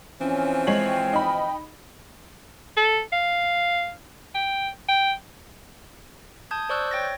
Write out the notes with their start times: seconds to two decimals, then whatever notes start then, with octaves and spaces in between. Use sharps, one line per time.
0.21 E3 F3 C4 C#4
0.67 G#3 C#5 F#7
0.86 G5
1.13 D#4 B5
2.77 A4
3.12 F5
4.35 G5
4.88 G5
6.51 A5 D#6 G6 G#6
6.69 C5 D5 C#6 E6 F#6 G6
6.91 C#5 G5 A6 A#6